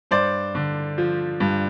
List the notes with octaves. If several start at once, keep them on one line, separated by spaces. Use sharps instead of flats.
G2 C5 D5
D3
F3
G2